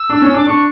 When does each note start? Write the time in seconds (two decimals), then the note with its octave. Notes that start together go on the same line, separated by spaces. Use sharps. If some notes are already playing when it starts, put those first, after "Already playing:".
Already playing: E6
0.10 D4
0.22 C#4
0.34 D4
0.38 D6
0.46 D4 C#6